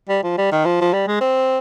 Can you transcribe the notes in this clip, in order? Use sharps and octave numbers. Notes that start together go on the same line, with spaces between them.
G3
F3
G3
D#3
F3
F3
G3
G#3
C4